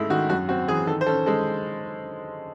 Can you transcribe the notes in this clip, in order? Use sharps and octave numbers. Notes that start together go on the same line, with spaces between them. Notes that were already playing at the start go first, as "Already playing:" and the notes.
Already playing: G#2 G#3 A3 E4
D#3 F#4
F#2 F#4
C4 F#4
E3 G#4
D#3 A4
C5
C#4 A4
G#3 A4